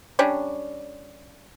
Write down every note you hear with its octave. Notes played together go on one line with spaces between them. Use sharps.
G3 C#4 D4